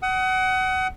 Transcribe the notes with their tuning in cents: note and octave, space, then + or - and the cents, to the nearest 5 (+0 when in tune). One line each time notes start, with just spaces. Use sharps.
F#5 +25 D#6 +25